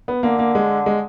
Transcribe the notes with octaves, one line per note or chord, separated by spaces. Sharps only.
B3
D3 A#3
A#3
G#3
G#3